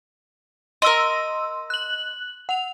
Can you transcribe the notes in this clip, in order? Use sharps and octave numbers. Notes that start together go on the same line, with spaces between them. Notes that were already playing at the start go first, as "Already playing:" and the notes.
A#4 D#5 C6 E6
F#6 F#7
F#5 F7